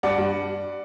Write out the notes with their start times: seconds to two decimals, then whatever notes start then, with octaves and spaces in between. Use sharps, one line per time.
0.03 G2 D5 F#5
0.18 G2